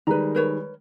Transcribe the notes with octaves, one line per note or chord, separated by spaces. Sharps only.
D#3 G3 G#3 B4 A#5
A#4 B4 C#5